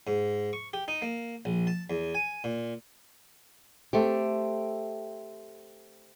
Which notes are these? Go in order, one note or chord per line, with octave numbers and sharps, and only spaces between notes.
G#2
C#6
G4
D#4
A#3
A#1
A5
E2
G#5
A#2
A3 C4 G4